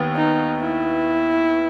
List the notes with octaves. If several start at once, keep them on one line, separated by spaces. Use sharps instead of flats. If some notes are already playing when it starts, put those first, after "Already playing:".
Already playing: D#2 B3
D#4
E4